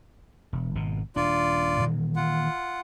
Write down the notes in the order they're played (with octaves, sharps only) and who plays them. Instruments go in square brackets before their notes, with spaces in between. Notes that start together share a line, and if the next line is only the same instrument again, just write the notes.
[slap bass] E1
G#1 B2
[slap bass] D#1 D4 [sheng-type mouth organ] F4 D5
[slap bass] A#2 D#3 E3
[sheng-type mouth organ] F4 F#5